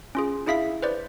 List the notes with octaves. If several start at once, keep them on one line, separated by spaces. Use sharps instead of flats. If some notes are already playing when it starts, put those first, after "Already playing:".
C#4 F4 G#4
D4 E4 G#4 E5 F5 B6
B4 C5 D5